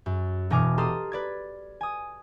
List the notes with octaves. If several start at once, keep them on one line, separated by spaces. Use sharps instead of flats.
F#2
E1 B2 D#5 G#5 D6 F6
G4 A4 A#5 C6 D#6 F6
B4 D5 G#6
G#5 D#6